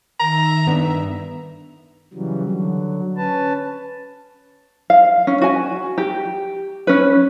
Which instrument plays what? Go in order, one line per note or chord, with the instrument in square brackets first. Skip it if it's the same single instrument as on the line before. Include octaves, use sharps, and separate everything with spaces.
[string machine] D#3 E5 [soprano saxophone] A#5
[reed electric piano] G2 B3 D4
[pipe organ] C#3 E3 F#3 G3
D3 F#3
C#4 B4 A5
[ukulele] F5
C#4
F#4 G#5
G4
C#4 B4